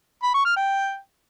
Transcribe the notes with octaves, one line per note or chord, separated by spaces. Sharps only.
B5
C#6
F6
G5